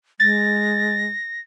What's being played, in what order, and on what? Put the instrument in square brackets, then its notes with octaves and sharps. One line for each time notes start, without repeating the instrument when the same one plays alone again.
[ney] G#3 [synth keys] A6 [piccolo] A#6